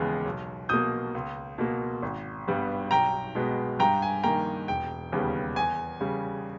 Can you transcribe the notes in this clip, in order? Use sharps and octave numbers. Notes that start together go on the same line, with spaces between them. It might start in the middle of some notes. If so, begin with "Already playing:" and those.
Already playing: D#2 C#3 E3 G#3 B3
B1
B2 A#3 D#6 G6
C#2
B2 A#3
G#1
G2 G3 B3
B1 G5 A#5
B2 G#3 B3
G2 G5 A#5
G#5
D#3 A#3 G5 A#5
E1 G5
D#2 C#3 G3 B3
E2 G#5
C#3 G3